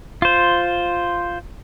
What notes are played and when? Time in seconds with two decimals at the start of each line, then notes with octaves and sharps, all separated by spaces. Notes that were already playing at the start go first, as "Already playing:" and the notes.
0.22 F4 C5